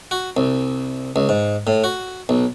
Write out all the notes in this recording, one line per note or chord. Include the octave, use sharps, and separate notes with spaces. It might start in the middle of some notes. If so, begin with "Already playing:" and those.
F#4
C2
C#2
G#2
A2
F#4
B1